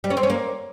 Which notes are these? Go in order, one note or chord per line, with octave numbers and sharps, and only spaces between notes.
G3
C#4
C4
C#4
A#3